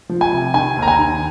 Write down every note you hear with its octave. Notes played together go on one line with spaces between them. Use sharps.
F3
G#5
C3
D#3 G#5
D#2
A#5
G#5
D#3